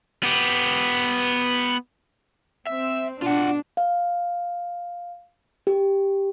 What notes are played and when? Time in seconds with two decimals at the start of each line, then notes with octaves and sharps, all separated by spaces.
0.23 B3 G4
2.67 C4 E5
3.22 B2 D4 F4 F#5
3.77 F5
5.67 G4